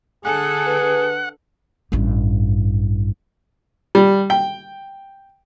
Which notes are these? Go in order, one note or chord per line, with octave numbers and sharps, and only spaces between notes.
D3 G#4 A4 F#5 G#5
B4
A1 G2
G3
G5